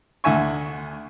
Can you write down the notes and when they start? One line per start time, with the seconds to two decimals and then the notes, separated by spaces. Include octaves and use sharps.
0.24 D2 D3 E5 G#5 C#6